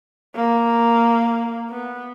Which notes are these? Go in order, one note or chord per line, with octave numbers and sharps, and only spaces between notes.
A#3
B3